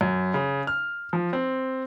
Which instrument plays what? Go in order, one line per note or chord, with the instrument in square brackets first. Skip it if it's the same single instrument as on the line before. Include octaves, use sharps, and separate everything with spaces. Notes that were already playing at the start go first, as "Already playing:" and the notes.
[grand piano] F#2
C#3
F6
F3
C4